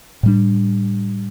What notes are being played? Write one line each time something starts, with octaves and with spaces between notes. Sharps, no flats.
A2 G3 D4